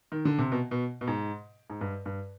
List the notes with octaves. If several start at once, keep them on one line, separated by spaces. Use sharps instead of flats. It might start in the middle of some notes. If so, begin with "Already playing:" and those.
D#3
D3
C3
B2
B2
B2
G#2
G#2
G2
G2